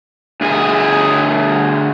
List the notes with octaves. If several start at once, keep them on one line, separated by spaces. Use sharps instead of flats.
D2 G#4